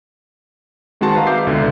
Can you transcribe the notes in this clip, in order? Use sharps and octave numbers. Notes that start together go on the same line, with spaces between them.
D#3 G#3 C4 F#4 A5 C6
B4 D#5 F5 A#5
E5 F5 D6 G6 C7
C#2 B2 D3